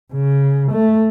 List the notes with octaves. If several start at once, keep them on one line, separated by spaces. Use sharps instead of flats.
C#3
A3